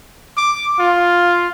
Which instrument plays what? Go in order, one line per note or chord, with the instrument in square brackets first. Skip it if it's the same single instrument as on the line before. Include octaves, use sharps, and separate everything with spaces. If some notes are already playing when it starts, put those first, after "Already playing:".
[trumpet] D6
F4